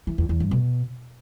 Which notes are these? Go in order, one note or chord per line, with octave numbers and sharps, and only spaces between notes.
E3
E2
E2
G2
B2